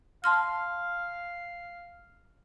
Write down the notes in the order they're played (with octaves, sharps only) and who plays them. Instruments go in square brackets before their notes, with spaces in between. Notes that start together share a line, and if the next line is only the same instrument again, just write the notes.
[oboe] F5 [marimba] A5 C6 F6